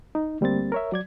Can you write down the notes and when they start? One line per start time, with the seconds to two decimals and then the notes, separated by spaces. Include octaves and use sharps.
0.15 D#4
0.41 D2 G3 A#3 C4 A6
0.72 A#4 C#5 E5
0.92 F#3 D5 G#6